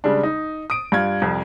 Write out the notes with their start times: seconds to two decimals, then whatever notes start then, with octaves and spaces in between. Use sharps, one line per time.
0.04 C#3 G3 G#3 D4
0.23 D#4
0.70 D#6 D7
0.92 G2 F4 G#6
1.22 C2 F2